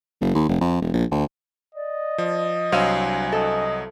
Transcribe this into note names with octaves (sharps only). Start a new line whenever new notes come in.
F#1
D#2
F1
F2
E1
A#1
D2
D5 D#5
F3
C2 F#3 D4 C5 E5 F5 G#5 D#7
A4 D#5